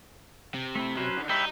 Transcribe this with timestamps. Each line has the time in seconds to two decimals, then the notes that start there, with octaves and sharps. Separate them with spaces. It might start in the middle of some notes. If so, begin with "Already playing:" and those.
0.54 C3
0.75 A3 C4 E4
0.97 F#3 C#4 B4 C5
1.17 D3 D#3
1.29 G2 D#4 C#5 E5 G5 B5